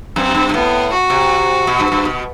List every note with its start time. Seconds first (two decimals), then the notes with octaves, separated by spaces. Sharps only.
0.16 F#2 C4
0.34 G2
0.49 B2
0.54 A2 B3
0.92 F#4
1.10 C3
1.67 B2
1.80 G2
1.92 G2
2.05 B2